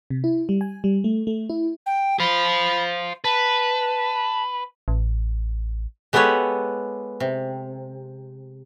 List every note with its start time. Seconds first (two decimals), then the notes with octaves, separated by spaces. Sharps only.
0.10 C3
0.24 E4
0.49 G3
0.61 G#5
0.84 G3
1.04 A3
1.27 A3
1.50 E4
1.86 G5
2.20 C5 F5 B5
3.24 B4 A5
4.88 A1
6.13 G#3 B3 G4 A4 B4 C#5
7.20 C3